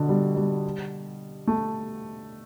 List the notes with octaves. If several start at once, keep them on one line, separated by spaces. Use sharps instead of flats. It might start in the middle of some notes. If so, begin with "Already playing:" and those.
Already playing: B2 D3
G3
G3
A3